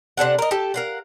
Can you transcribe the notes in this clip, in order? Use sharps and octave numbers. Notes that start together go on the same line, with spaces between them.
C3 D4 A4 F#5
A#4 D#5
G4 A4
A#4 F5 F#5